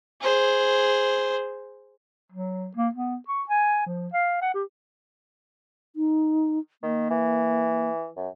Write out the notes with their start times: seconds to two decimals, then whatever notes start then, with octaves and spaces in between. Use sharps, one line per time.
0.21 G#4 C5
2.32 F#3
2.76 A#3
2.95 B3
3.28 C#6
3.49 G#5
3.86 F3
4.13 F5
4.42 F#5
4.54 G4
5.96 D#4
6.83 D#3 A#3
7.10 E3
8.16 F#2